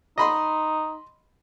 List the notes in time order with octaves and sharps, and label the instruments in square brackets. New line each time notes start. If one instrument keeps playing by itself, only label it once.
[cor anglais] D#4 [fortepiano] D#5 B5 C6